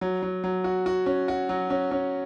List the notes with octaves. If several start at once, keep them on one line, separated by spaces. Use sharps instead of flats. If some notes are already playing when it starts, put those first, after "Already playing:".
F#3
F#3
F#3
F#4
F#4
C#4
F#4
F#3
C#4
C#4